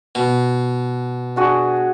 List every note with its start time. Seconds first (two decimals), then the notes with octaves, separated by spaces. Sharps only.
0.15 B2
1.36 D4 F#4 G#4